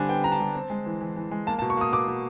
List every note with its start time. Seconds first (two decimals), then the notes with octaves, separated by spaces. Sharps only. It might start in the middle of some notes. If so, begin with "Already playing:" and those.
Already playing: D3 G3 C4 D4 G#5
0.09 B3 G5
0.24 D4 A#5
0.32 A5
0.40 G3
0.55 C4
0.70 G#3
0.86 E3
1.01 E3
1.16 E3
1.31 G#3
1.47 A#3 A5
1.59 A5
1.62 B2
1.70 C#6
1.77 A#3 D#6
1.92 B2 D6
2.08 B2